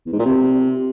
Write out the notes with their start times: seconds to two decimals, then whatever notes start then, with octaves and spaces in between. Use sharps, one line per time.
0.06 E2
0.13 G#2
0.19 A#2
0.26 C3